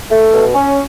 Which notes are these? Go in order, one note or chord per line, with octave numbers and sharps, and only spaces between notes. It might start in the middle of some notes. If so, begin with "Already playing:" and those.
A3
B2
C#4